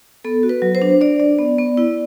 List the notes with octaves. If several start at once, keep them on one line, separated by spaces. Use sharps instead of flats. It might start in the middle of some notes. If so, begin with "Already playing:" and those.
B3 A4
F#4
B4
F#3
C5
D4
D4 D5
D4
B3
B3
E4